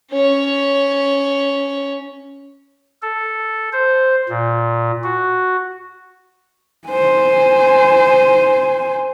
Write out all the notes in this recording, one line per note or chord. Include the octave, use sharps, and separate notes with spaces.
C#4 C#5
A4
C5
A#2
F#4
C5 G#5